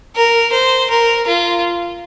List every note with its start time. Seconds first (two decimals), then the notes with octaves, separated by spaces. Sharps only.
0.16 A#4
0.53 C5
0.90 A#4
1.27 F4